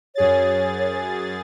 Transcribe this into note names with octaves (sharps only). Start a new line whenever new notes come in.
F#2 G#4 C#5 A6